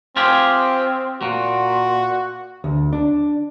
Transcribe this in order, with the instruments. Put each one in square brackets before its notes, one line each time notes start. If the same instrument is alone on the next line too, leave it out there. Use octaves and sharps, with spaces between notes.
[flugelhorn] C4 [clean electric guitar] F4 G4 G#4
[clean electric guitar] A#2 [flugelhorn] F#4
[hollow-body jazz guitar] D2
D4